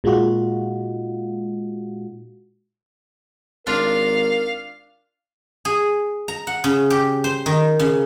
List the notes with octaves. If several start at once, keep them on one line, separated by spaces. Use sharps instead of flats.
A#2 G#3 D#4 F4 F#4
G#1 D4 F4 A#4 F5 A#5
G#4
A#5
F#5
C#3
G4
C5
D#3
C#3